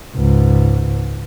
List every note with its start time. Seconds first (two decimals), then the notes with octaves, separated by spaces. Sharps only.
0.15 C#2 G#2